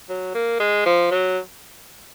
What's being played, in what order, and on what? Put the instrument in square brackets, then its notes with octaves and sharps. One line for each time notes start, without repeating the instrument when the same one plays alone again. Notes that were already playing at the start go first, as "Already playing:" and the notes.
[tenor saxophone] F#3
A#3
G#3
F3
F#3